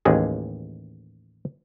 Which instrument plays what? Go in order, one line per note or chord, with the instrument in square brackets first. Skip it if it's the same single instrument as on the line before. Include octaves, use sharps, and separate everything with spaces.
[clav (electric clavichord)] A1 D#2 G#3 G#4